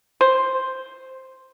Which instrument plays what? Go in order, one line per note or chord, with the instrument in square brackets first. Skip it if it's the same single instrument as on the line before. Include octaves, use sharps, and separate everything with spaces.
[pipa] C5